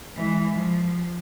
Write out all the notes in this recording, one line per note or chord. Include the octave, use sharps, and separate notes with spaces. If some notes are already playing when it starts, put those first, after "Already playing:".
E3 G#3
F3